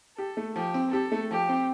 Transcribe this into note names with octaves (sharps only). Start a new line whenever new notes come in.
G4 A4
A3
F3 G4
C4
G4 A4
A3
F3 G4
C4